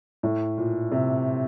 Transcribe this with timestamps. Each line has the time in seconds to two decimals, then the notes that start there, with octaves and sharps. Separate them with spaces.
0.23 A2
0.58 A#2
0.92 C3